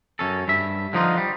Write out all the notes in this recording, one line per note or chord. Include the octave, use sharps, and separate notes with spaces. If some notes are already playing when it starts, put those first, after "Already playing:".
F#2 C#4 A4
G2 E5
D3 F3 D#4 F4
G3